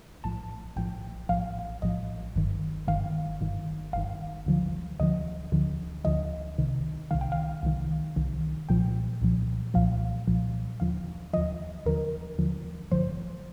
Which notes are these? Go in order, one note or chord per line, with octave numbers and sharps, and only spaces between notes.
A#1 A2 F3 A5
A#1 A2 F3 G5
A#1 A2 F3 F5
A#1 A2 F3 D#5
G1 G2 D#3
G1 G2 D#3 F5
G1 G2 D#3
G1 G2 D#3 F5
D2 D3 F3
D2 D3 F3 D#5
D2 D3 F3
D2 D3 F3 D#5
C2 C3 D#3
C2 C3 D#3 F5
G5
F5
C2 C3 D#3
C2 C3 D#3
C2 A#2 F3 G5
C2 A#2 F3
C2 A#2 F3 F5
C2 A#2 F3
D#2 D3 F3 F5
D#2 D3 F3 D#5
D#2 D3 F3 A#4
D#2 D3 F3
A1 G2 D3 F3 C5